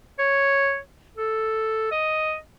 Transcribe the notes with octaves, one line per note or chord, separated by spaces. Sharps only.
C#5
A4
D#5